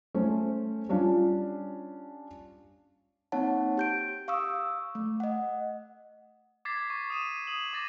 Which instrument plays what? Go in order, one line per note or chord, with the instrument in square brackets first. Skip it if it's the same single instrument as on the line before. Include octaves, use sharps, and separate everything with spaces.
[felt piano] A3 C#4 C5
G3 C#4 D4 F4
[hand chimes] A#3 C4 D#4 C#5 F#5 A5
G4 G6 D7
F5 C#6 D#6 E6
A3
D#5 F#5
[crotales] D6 G#6 A6 B6 C7
C#6
D#6 D#7 E7
D#6 F#7
C#6 D6 A6 A#6 D#7